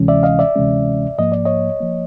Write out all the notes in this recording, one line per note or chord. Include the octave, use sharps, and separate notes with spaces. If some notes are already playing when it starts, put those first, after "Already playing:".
Already playing: D2 C3 E3 G#3 C#4
D5 E5
D#5 F5
D5 E5
D2 C3 E3 G#3 C#4
G#2 F3 A#3 D#5
D5
C#5 D#5
F3 A#3